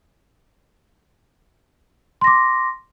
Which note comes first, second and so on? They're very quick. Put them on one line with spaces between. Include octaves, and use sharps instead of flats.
C6 A#6 D6